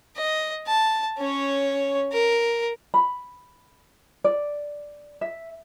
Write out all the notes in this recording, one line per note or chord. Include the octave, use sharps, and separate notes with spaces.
D#5
A5
C#4 C#5
A#4
B5
D5
E5